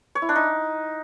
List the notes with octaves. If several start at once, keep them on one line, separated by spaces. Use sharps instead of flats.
C#5
E4
D4
D#4